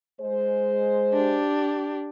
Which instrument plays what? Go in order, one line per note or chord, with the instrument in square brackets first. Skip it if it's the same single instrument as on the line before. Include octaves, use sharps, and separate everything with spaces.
[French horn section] G#3 C5
[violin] D4 G4